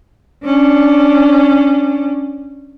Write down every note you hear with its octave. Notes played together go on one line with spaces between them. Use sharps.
C#4 D4